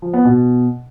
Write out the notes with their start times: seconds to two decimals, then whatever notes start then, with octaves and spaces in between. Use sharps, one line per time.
0.02 F3
0.13 B3
0.25 B2